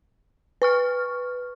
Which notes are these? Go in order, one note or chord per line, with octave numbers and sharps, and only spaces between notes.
B4 C#6 F6